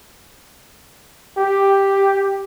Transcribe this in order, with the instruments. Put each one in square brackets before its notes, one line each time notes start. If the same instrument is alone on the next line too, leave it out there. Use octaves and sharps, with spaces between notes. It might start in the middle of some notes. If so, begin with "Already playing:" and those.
[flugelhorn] G4